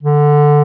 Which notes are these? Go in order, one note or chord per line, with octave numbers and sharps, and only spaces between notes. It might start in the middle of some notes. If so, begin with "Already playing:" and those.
D3